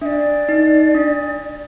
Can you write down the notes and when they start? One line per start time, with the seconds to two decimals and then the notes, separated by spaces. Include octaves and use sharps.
0.01 D4 E5
0.06 D5
0.49 D#4
0.95 D4